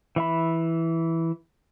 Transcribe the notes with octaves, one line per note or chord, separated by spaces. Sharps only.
E3 E5 B5